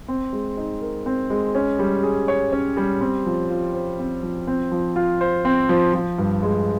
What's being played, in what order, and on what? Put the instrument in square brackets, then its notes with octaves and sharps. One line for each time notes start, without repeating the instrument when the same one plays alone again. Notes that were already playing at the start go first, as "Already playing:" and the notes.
[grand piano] C4
G#3
D#4
A#4
C4
G#3
C#4
G3
G#4
C#5
C#4
G3
C4
F3
F4
C5
C4
F3
C4
F3
F4
C5
C4
F3
F3
G2
G#3